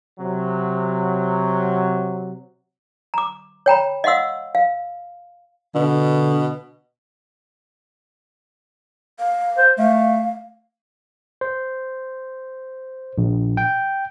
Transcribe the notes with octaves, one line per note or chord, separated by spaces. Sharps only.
C3 F#3
A#5 D6
C#5 G5 A#5 B5
D#5 F5 F#5 C6 E6
F5
B2 D3
F5
C5
A3 F5
C5
A#1
G5